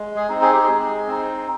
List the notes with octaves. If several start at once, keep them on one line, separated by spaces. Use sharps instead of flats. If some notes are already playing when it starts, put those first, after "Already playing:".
Already playing: G#3
G#4
C4 D#4
G#4
G4
G#3 G#4
C4 D#4